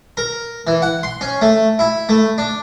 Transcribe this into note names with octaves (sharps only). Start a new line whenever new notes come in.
A#4
E3
F#5
C6
C#4
A3
E4
A3
D4